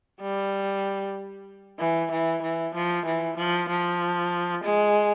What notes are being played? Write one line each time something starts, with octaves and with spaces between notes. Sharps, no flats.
G3
E3
E3
E3
F3
E3
F3
F3
G#3